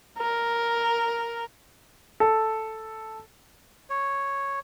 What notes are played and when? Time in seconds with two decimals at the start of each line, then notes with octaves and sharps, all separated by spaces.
0.19 A#4
2.20 A4
3.90 C#5